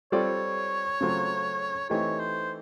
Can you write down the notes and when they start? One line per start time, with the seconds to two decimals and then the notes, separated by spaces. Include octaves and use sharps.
0.12 G3 C4 F4 A4 C#5 D5
1.01 C#3 F#3 A3 C4 F4
1.90 E3 A3 C4 D#4 G4 C#5
2.19 C5